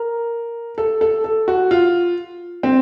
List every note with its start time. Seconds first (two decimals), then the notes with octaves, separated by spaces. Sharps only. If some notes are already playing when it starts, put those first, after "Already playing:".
Already playing: A#4
0.78 A4
1.01 A4
1.24 A4
1.48 F#4
1.71 F4
2.63 C4